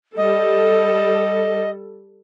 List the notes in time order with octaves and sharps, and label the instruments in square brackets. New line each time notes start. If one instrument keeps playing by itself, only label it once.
[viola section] G3 A4 [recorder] D#5